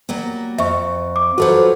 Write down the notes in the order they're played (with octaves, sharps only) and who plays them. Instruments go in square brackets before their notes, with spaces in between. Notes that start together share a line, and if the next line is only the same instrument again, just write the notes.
[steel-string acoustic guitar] F#3 G3 A#3
[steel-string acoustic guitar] F2 [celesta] E5 C#6
[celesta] D6
[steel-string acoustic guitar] F#3 F4 B4 [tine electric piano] F#4 A4 C5